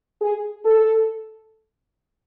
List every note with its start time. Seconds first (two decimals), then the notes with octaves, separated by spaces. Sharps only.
0.21 G#4
0.65 A4